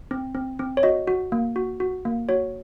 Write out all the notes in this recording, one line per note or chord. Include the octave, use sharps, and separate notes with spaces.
C4
C4
C4
C#5
F#4 D#5
F#4
A#3
F#4
F#4
A#3
F#4 C#5